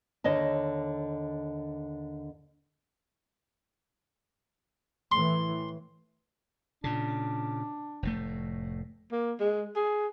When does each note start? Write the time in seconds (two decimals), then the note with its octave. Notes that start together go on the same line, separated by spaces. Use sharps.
0.24 D#2 D3 C#5 D#5 A5
5.12 A2 E3 C6
6.84 A#2 C#3 D4
8.03 F1 A2 A3
9.12 A#3
9.40 G#3
9.76 G#4